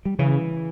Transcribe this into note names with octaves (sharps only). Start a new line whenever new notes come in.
G3
C#3 E3